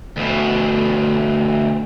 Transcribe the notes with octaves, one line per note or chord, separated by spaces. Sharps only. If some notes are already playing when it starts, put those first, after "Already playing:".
D2 B2